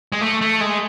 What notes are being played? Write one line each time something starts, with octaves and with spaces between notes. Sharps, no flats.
G#3
A3
A3
G#3